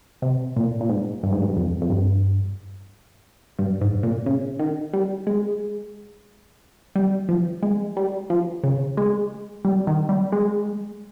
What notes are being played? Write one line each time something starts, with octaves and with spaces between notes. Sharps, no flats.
C3
A#2
A#2
G#2
G2
G#2
G2
F2
F2
G2
G2
G#2
A#2
C#3
D#3
G3
G#3
G3
F3
G#3
G3
F3
C#3
G#3
G3
D#3
G3
G#3